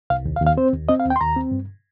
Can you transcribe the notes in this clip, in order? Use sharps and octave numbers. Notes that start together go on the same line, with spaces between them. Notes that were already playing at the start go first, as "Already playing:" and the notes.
C2 F5
D#2
F5
D#2
F5
C4 C5
D#2
C4 D#5
F5
D#2
G5
C6
D#2 A#5
C4
G2